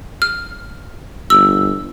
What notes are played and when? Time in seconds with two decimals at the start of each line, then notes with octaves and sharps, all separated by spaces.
0.22 F6
1.30 G1 E6